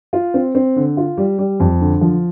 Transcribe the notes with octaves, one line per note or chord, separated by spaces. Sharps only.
F4
C4
C4
D3
F4
G3
G3
F2
D3
F3